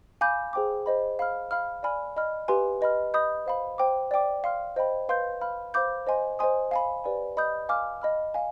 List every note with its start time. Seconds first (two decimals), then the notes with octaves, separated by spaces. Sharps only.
0.21 F5 G#5 B5 D6 G6
0.53 G#4 C5 G5 D6
0.86 C5 D#5 B5
1.19 F5 B5 F6
1.51 F5 B5 F6
1.83 D5 G#5 B5 F6
2.17 D#5 B5 F6
2.48 G4 B4 F5 G#5 C6
2.81 B4 D#5 B5 F6
3.14 D#5 B5 D#6 G6
3.46 C5 F5 B5
3.78 C5 G5 D6
4.11 D5 G5 D6
4.44 F5 C6 F6
4.76 C5 D#5 G5 B5
5.09 B4 F5 C6 G6
5.41 F5 B5 F6
5.74 C5 F5 B5 D6 G6
6.07 C5 D#5 G#5 C6
6.39 C5 D#5 G#5 C6 D#6
6.71 F5 G#5 B5
7.04 G4 B4 D5 G#5 B5
7.37 D#5 B5 D#6 G6
7.69 F5 G#5 D6 F6
8.02 D#5 B5 F6
8.34 F5 G#5